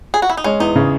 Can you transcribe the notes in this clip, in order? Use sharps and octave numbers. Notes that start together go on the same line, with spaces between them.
G#4
F#4
E4
D#4
G#3 C#4
E2 D#4
C#3